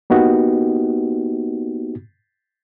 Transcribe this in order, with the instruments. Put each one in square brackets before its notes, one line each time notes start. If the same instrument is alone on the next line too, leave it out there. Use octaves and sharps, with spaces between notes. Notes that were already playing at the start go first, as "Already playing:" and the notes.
[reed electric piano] A#3 B3 D#4 F#4 G4